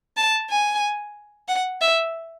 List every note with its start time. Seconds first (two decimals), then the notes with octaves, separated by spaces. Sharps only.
0.17 A5
0.50 G#5
1.48 F#5
1.81 E5